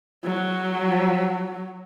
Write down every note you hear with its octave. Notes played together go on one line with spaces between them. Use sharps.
F#3